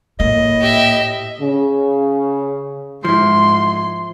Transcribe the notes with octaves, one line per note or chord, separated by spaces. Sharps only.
A2 A#3 D#5
G4 E5
C#3
G#2 F3 E4 C6